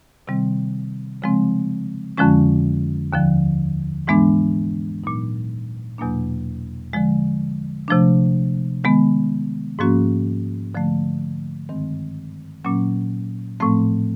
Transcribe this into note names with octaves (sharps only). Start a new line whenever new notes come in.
C3 D#3 G3 C4
C#3 F3 G#3 C4
F2 D3 F3 G#3 C#4
D#2 D3 F3
G#2 E3 G#3 B3 D4
A#2 F#3 B3 D#4
E2 B2 F#3 A#3 D4
D3 F3 G#3
C3 F3 A3 D4
D#3 G#3 B3
G#2 F3 A#3 C#4 F#4
D3 F3 A3
G2 D#3 G#3 C4
A#2 F#3 A#3 C#4
A2 F3 A3 C4